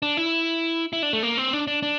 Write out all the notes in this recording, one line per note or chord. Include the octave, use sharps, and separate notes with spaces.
D4
E4
E4
D4
A3
A#3
C4
D4
D4
D4